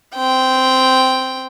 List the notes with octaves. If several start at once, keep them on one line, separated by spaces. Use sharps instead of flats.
C4 G5